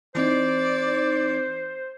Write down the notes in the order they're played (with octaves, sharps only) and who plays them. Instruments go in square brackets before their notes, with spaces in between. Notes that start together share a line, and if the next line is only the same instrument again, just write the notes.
[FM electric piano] E3 C4 D#4 [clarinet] C5 [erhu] D5